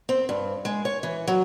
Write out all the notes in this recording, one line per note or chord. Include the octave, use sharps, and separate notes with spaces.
C4
G2
G#3
C#5
E3
F#3